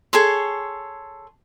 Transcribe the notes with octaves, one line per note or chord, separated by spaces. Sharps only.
G#4 A4 C#5 C6